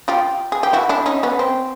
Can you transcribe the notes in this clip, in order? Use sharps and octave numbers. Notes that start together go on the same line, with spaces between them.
F4 G4
G#4
G4
E4 F#4
D4 E4
C#4 D#4
B3 C#4
C4